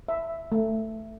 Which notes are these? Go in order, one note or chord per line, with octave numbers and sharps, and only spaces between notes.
E5
A3